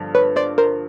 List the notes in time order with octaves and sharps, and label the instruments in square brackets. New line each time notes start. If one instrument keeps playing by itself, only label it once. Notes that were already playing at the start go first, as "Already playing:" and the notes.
Already playing: [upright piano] G2 D3 F3
[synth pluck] B4 C#5
C5 D5
A#4 C5